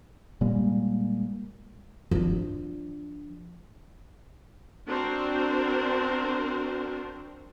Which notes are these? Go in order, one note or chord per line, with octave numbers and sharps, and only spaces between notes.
A#2 G3 G#3 A#3
F3 D4
C4 D4 F#4 A#4 C5